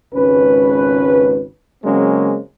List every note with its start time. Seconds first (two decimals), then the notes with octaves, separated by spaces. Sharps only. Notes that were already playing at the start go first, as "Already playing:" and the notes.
0.13 G#1 C#2 C#4 B4
1.84 C#3 F#3 G#3 A#3 C4 C#4